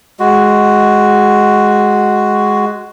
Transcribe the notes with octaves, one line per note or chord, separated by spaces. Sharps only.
G#3 F#4